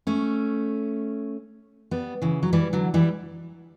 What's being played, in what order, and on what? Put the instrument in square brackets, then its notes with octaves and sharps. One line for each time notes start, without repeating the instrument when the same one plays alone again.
[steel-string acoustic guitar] A3 C#4
G3 B3
C#3 E3
F#3
E3 G3
D3 F#3
E3 G3